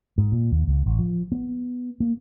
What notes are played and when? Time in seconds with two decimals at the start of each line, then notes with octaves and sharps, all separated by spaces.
0.18 G#2
0.32 A#2
0.51 D#2
0.68 C#2
0.86 A1
0.99 F3
1.32 B3
2.00 A#3